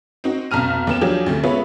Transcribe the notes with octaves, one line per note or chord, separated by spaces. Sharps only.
C4 D#4 F#4
F1 B1 A5 A#5 F6 D#7
D#2 B3 E7
F3 F#3 D4 G4 G#4
D2 C3 A3
G#3 B3 F4 B4 C#5 E5